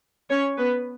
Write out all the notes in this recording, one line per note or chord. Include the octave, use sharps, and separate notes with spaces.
C#4 C#5
B3 B4